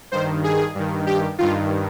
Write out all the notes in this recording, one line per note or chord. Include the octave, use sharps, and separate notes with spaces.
G2 D#3 C5
G#4
G2 D#3
G4
G2 D#3 F4